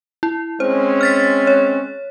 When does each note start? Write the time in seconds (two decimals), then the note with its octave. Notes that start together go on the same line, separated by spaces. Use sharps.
0.23 E4
0.60 G#3 C4 C#4 C5
1.01 F6 A6 B6
1.47 C#5